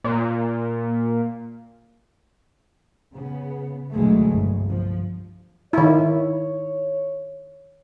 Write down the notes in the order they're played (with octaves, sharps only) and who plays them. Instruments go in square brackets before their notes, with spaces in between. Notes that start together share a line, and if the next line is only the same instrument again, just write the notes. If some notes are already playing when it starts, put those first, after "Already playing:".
[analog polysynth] A#2
[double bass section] C#3 B3
D2 B2 E3 F#3 G#3 A3
G1 C2
F3
[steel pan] D#3 E4 [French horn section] C#5